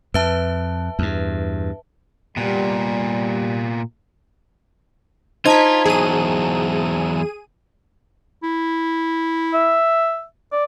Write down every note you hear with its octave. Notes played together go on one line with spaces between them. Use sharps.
F2 B4 E5 A5
E2 G2
A#2 G3 B3
D#4 F4 C5 A5 A#5 G#6 B6
E2 F#3 G#4 D#7
E4
E5
D5